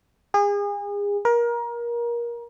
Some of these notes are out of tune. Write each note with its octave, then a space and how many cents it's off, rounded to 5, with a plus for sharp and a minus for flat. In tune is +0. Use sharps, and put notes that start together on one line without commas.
G#4 -35
A#4 +25